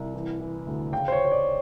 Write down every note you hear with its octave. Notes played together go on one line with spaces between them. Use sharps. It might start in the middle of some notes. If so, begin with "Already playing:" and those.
Already playing: C2
E3
E3
D2
C#3 G5
C5
C#5
C#3
C#5
D5